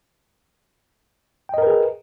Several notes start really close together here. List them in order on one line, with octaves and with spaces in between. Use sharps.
G5 D#5 A#4 B4 G#4